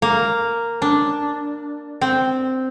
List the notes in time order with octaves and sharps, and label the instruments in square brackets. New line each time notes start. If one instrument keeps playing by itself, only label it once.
[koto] A#3
D4
C4